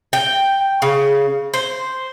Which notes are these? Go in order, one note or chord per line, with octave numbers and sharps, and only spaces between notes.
G5
C#3
C5